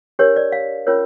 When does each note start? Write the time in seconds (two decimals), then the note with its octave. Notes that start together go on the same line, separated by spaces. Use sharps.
0.19 D4 G4 A#4 C#5
0.36 D5
0.52 F5
0.87 C#4 F4 A#4 C#5